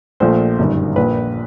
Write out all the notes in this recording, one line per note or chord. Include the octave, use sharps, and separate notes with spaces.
A#1 A#2 F3 A3 C5
G1 F#2 D#3 G3
A#1 A#2 F3 B4